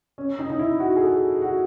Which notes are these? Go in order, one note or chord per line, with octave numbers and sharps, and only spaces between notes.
C#4
D#4
D#4
E4
F#4
G#4
A4
F#4